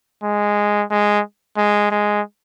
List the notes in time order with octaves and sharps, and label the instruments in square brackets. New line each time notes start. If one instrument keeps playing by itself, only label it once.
[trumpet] G#3
G#3
G#3
G#3